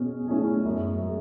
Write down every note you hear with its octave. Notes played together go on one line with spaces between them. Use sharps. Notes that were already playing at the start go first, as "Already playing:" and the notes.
Already playing: B2 C#4 G#4
A3 C#4 E4 G#4
F#2
G#3